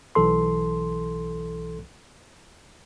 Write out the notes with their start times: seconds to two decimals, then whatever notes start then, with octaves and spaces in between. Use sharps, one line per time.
0.15 B1 E3 A4 C6